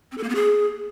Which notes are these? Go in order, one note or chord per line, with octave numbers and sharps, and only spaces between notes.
C4
A4
A#3
B3
G#4